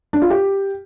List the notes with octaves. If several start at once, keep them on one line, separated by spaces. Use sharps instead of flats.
D4
F4
G4